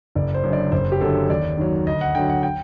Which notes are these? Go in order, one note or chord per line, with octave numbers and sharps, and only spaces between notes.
F#1 D5
C5
F#2 D3
D5
F#1 C5
G4
F#2 D3 F#3 A4
D#2 D5
D#3 F#3
D2 D#5
F#5
D3 F#3 G5
F#5
G5